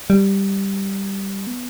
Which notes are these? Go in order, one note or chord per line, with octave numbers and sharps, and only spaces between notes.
G3
B3